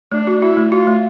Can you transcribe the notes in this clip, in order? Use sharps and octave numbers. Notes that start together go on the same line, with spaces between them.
A3 D4
F#4
E4 F#4
A3
F4 F#4
A3